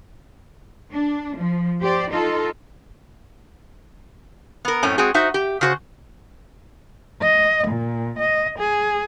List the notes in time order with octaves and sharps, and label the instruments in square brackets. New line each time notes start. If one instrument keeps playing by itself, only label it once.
[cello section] D4
F3
G4 C5 D5
D#4 F4 A4
[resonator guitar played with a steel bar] B3 A#4
F#2 A2 A3 C4 C#4
G#3 C4 F#4 G#4
D#4 F#4 C5 E5
G4
C#3 F#4 C5
[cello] D#5
A#2
D#5
G#4